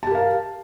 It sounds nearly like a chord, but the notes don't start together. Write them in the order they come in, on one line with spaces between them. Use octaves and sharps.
A5 G4 A#4 F5